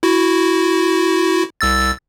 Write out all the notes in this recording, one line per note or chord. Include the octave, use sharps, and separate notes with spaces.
E4 F#4
C2 E6 A6